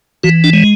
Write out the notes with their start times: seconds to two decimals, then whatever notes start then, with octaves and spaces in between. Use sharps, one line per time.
0.23 E3 F#4
0.44 D4
0.53 G#3